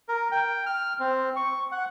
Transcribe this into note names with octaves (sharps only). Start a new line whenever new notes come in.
A#4
G5
F6
C4
C#6
F#5